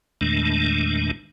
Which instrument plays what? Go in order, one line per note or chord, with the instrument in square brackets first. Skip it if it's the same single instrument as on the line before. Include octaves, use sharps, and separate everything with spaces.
[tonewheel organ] E2 A#2 D#3 G#3 A3 D4